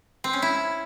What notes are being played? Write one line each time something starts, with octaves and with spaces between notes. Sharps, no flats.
C4
C#4
E4